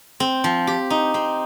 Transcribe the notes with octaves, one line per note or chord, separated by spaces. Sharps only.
C4
F3
G4
D#4
C4